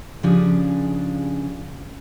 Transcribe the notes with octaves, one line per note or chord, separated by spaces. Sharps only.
C#3 F3 C#4 D4 G4 G#4